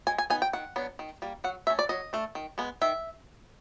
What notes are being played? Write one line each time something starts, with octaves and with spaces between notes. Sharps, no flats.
G#3 G#5
G#5
B3 D#4 G#5
G5
D#3 F#5
F#3 B3 D4
D#3
G3 A#3
F#3 F#5
A3 C#4 E5
D5
F#3 D#5
A3 D4
D#3
G#3 B3
D#3 E5